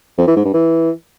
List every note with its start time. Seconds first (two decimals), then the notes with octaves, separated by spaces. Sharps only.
0.18 F2
0.27 E3
0.36 G#2
0.45 G2
0.53 E3